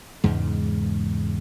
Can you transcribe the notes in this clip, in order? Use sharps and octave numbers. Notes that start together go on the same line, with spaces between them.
E2 G#2 C#3 G#3